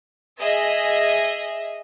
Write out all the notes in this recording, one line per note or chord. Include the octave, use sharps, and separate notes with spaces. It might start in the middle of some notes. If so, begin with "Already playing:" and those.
G#4 D#5 E5